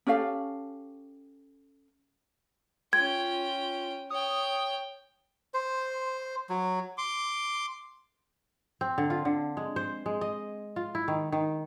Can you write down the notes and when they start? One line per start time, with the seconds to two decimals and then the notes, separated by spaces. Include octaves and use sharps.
0.07 C#4 G4 A4 F5
2.93 C#4 F4 G5 G#6
4.10 C#5 G5 D#6
5.54 C5
6.49 F#3
6.98 C6 D6
8.81 C4
8.98 D3
9.10 F4
9.25 D3
9.57 G#3
9.76 C5
10.06 G#3
10.21 D#5
10.76 F4
10.95 E4
11.08 D#3
11.32 D#3